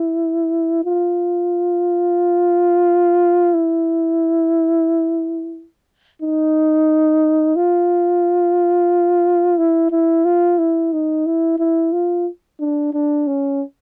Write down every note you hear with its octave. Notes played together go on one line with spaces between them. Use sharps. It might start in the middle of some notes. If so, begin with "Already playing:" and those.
Already playing: E4
F4
E4
D#4
F4
E4
E4
F4
E4
D#4
E4
E4
F4
D4
D4
C#4